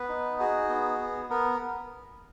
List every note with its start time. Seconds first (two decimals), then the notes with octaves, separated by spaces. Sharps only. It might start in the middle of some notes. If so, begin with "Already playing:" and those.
Already playing: B3 B4
0.09 D#4
0.39 F#4 G#4
0.69 B3
0.99 B3
1.30 B3 A#4